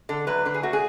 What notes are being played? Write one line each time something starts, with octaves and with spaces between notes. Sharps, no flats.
D3 A4
F#3 A3 B4
D3 B4
G#4
A3 F#4
G#4